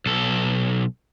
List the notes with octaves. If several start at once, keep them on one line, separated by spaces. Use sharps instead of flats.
B1 A4